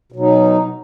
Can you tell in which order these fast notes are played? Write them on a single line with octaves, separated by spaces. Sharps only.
B2 F#3 D#4